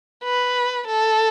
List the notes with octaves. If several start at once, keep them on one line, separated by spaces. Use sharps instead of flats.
B4
A4